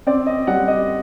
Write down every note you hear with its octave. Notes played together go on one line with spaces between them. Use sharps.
C4 D5
D#5
G3 F#5
D#5